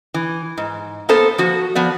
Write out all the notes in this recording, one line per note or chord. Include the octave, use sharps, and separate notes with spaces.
E3
G#2
A#3 B3 A4 C5
F3 F#4
F3 B3 D5